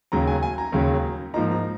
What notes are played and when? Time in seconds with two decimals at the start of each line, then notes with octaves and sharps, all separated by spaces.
0.12 D#2 C#3 F#3 A#5
0.27 G#5
0.43 G#5
0.58 A#5
0.72 D#2 C#3 F#3
1.34 G#2 F3 A#3 D#4 A#5
1.51 A#5